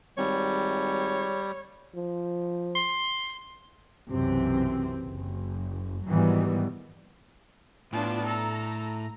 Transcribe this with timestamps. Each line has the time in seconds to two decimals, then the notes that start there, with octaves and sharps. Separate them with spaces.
0.18 G#1 G3 C#5
1.95 F3
2.75 C6
4.10 B1 F#2 C3 E3 C4
5.00 F#1
6.07 G#2 D#3 E3 F#3 G3 B3
7.93 A2 B3 D4 F4 A5
8.26 A4 A#5